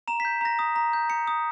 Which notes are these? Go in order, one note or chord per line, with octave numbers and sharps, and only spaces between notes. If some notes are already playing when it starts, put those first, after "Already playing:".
A#5 E7
B6
G6
A#5 A#6
D#6
A#5
G6
A#5 C#7
D#6